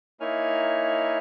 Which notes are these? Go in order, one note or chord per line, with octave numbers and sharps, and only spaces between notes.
A#3 D#4 E4 C#5 G#5 F6